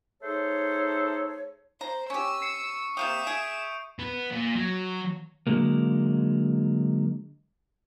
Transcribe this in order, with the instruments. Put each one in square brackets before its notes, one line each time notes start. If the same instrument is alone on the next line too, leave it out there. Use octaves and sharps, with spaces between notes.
[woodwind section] A3 D#4 G#4 A4 C5 C#5
[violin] C5 [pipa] A#5
[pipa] C#4 G4 [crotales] C#6 [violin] E6
[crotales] C7 C#7
[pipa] C3 A#3 G5 [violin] E5 E7 [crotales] D#6 G6 D#7
[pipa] G#4 [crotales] D7
[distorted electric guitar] B3
A#2
F#3
[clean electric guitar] D3 F#3 G#3 A#3